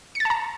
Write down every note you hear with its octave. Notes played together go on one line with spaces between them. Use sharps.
A5 A#5 A6 C#7